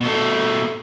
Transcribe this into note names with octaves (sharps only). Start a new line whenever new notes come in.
B2 A3